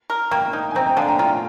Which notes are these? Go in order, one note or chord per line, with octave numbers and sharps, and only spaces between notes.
A#4
A#3 G5 A#5
D#4
G#5
C4 G5 A#5
G5 A#5
D3 F5 G#5
G5 A#5
F4 G5 A#5